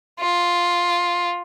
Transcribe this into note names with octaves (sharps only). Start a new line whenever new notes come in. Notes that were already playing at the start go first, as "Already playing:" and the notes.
F4